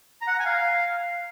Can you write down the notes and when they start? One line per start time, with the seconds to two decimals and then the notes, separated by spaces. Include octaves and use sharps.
0.21 A#5
0.27 F#5
0.33 A#5
0.39 G#5
0.45 F5